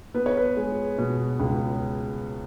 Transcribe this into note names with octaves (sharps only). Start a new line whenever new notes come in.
B3 B4
C#5
B4
G#3
B2
C#2